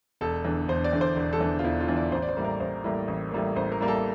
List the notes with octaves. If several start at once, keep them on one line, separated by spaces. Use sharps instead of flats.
E1 A4
E2 D3
E1 C5
D5
E2 D3
C5
E1
A4
E2 D3
F4
E1 E4
F4
E2 D3
D5
A1 C5
D5
C5
A2 G3 A#3
A#4
A1 C5
A2 G3 A#3
A1
A2 G3 A#3
A1 C5
A#4
A2 G3 A#3
A4